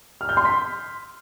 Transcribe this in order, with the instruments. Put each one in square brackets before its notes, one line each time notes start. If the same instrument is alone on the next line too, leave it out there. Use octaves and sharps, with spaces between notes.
[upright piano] F6
G6
C6
B6